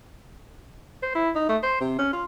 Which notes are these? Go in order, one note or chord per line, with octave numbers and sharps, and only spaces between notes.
C5
E4
D#4
A3
C5
C3
C#4
F4